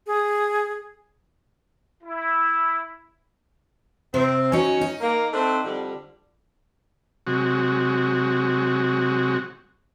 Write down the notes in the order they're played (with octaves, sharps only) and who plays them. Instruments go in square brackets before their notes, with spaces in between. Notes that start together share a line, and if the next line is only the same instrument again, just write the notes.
[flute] G#4
[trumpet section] E4
[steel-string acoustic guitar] C3 C5 [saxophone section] C4
[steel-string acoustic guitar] F#3 D#4 [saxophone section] C#4
[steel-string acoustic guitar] D#4
[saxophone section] A#3
A3 C4 D4
F2 D3 G3
[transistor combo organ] C3 F#3 G#3 F#4